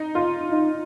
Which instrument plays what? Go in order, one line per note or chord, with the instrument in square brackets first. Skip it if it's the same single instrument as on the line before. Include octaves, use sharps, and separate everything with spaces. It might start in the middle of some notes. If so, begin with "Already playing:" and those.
Already playing: [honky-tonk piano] D#4
F4
[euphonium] D#4